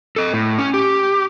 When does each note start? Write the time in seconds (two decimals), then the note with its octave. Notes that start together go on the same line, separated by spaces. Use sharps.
0.16 A4 D#5
0.34 A2
0.59 C#4
0.74 G4